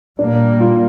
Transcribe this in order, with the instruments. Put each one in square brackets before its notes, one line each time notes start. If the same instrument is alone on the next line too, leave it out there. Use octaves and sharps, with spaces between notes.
[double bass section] A#2 G3 A#3 [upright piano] D4
[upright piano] F4